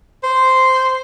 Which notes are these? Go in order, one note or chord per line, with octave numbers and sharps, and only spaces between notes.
C5